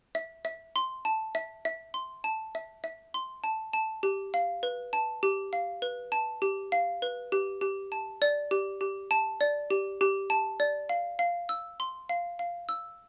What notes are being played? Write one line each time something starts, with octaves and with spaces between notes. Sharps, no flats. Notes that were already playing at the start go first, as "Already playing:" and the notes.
E5
E5
C6
A5
E5
E5
C6
A5
E5
E5
C6
A5
A5
G4
F5
B4
A5
G4
F5
B4
A5
G4
F5
B4
G4
G4
A5
D5
G4
G4
A5
D5
G4
G4
A5
D5
F5
F5
E6
C6
F5
F5
E6